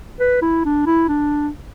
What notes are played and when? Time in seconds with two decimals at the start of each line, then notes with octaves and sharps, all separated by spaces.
0.20 B4
0.42 E4
0.65 D4
0.86 E4
1.09 D4